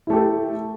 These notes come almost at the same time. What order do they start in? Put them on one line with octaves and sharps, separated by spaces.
E4 A3 G4 A4